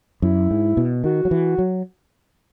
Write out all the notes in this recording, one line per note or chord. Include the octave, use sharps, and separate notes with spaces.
F#2 E4
G#2
B2
D#3 F#4
F#3
E3
F#3